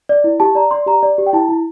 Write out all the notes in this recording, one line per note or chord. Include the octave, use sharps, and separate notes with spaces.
D5
E4
G4 A5
D5 A#5
D5 C6
G4 A#5
D5
G4
G5
E4 A5
E4